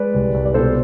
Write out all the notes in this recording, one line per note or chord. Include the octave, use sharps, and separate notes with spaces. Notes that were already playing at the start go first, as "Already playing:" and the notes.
Already playing: G#3 B4 D5
C2
C2
D5
B2 A4 C5